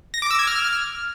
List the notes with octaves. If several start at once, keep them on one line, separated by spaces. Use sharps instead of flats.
A#6
D6
E6
G#6
F6